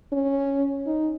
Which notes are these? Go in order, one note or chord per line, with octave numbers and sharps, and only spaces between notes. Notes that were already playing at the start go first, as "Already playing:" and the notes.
C#4
D#4